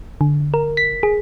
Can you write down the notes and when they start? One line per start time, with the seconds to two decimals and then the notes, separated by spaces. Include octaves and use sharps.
0.21 D3
0.54 A#4
0.77 B6
1.03 G#4